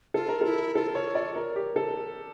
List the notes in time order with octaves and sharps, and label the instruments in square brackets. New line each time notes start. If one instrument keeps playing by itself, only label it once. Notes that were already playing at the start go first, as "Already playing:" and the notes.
[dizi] F4 [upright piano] A4
[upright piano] A#4
[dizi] E4 [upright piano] A4
[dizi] F4 [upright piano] A4
[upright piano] C#5
D5
A#4
G4
A4